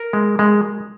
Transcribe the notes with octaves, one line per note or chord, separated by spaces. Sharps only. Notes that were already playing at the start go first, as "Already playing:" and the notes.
Already playing: A#4
G#3
G#3